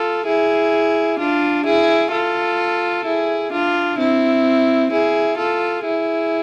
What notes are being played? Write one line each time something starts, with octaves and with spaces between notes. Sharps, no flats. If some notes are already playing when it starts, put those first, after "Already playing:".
Already playing: F4 A4
E4 G#4
D4 F4
E4 G#4
F4 A4
E4 G#4
D4 F4
C4 E4
E4 G#4
F4 A4
E4 G#4